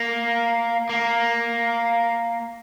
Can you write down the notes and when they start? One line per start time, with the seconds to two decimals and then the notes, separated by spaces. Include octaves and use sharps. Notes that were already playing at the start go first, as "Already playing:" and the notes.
Already playing: A#3
0.89 A#3